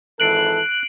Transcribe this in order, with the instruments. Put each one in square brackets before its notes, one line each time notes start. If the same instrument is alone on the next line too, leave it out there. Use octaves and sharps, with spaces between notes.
[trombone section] G#1 E3 A4 [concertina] F#6 [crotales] C7 D7 F#7